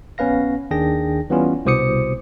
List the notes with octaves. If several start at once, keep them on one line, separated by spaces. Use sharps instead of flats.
A#1 B3 C#4 B4 F5 A#6
D#2 D#3 D4 G#4 G5 A#6
E3 G3 B3 C#4 F4
C2 B2 C5 D6 D#6 C#7